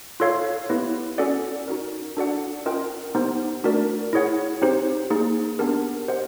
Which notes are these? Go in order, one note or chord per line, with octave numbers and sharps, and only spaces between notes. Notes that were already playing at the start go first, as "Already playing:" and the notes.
F4 A4 C#5 F5
B3 E4 G4 B4
C#4 F#4 A4 D5 F#5
D#4 F#4 A#4
D4 F#4 A4 D5 F#5
C#4 F4 A#4 D#5 G5
B3 D#4 G4 C5
A3 D4 F#4 A#4 D5
E4 G#4 C#5 F#5
C4 D#4 G4 C5
A#3 D#4 G#4
B3 D4 G4 A#4
G4 C5 D#5 F#5